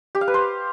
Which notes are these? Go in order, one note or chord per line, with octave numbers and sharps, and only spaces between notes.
G4
F5
B4
C5